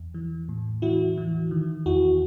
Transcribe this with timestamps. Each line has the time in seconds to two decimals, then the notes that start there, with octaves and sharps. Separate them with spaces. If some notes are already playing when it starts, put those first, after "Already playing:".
Already playing: E2
0.14 E3
0.49 A2
0.82 E3 E4 F#4
1.18 E3
1.51 D#3
1.86 E2 E4 F#4